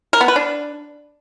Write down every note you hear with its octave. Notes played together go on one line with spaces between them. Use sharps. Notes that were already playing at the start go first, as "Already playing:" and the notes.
A#4
B3
B4
D4